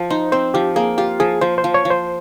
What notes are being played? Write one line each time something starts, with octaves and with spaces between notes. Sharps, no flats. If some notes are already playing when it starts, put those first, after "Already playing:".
Already playing: F3
D#4 C5
C4 C5
F3 G4
A#3 G#4
F4 G4
F3 G#4
F3 C5
C5
F3
C#5
F3
C5